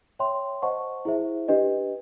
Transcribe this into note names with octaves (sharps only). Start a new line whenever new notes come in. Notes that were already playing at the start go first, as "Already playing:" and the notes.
C#5 E5 G5 C6
C5 D#5 F#5 A5 C#6
E4 G#4 C5 E5
D4 G4 B4 D#5